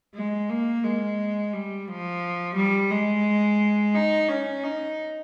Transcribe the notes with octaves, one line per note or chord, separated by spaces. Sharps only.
G#3
A#3
G#3
G3
F3
G3
G#3
D#4
C#4
D#4